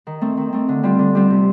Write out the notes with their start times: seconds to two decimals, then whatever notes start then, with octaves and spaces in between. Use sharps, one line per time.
0.07 D#3
0.21 A3 C4
0.37 D#3
0.53 A3 C4
0.69 D3
0.83 G3 C4 F4
0.99 D3
1.15 G3 C4 F4
1.30 C3